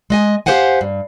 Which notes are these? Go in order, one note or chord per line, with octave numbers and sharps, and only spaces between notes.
G#3 D#5 G#5
G4 A#4 C5 F5 F#5 G#5
G2